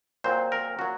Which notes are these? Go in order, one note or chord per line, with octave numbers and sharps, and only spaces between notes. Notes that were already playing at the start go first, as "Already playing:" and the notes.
A#2 F#3 C4 C5
A#4
A#2 F#3 F#4